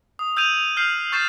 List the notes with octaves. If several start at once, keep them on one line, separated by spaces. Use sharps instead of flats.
D#6
E6 G6 G#6 D#7 F7
F6 G6 C7 F#7
C#6 G6 A6 C7 E7